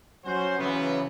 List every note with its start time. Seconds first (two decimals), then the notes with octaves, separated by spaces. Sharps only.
0.25 F#3 C#4 F#4 C5
0.59 C#3 E3 F#3 B3